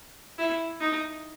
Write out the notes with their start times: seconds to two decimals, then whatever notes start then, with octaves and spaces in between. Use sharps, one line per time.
0.38 E4
0.81 D#4